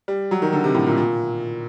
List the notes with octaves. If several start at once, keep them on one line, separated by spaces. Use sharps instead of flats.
G3
F#3
D#3
D3
C3
A2
A#2
A#2